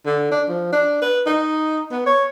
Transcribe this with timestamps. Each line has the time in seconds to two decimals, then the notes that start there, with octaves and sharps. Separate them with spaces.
0.06 D3
0.31 D4
0.49 F3
0.72 D4
1.02 B4
1.26 D#4
1.91 B3
2.06 C#5